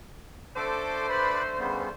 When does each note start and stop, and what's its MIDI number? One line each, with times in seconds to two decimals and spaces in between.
0.56 1.95 50
0.56 1.95 57
0.56 1.06 69
0.56 1.95 72
0.56 1.06 86
1.09 1.42 71
1.09 1.42 74
1.09 1.42 83
1.59 1.89 49
1.59 1.89 55
1.59 1.89 59